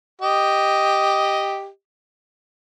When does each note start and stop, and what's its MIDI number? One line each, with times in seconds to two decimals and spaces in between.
0.21 1.68 67
0.21 1.68 75